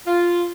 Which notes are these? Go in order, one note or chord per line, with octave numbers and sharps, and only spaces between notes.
F4